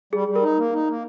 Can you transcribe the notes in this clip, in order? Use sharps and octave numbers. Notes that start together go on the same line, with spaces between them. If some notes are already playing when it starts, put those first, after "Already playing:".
G3 G#4
G3
A#4
D#4
A#3
D#4
A#3